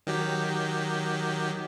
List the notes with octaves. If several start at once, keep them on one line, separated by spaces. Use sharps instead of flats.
D#3 F#3 G4